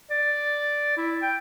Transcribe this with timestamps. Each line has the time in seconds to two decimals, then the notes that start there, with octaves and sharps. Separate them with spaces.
0.11 D5
0.97 E4
1.22 G5